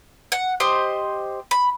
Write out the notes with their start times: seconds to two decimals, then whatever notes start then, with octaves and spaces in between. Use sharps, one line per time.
0.32 F#5
0.60 G4 C5 D#5
1.51 B5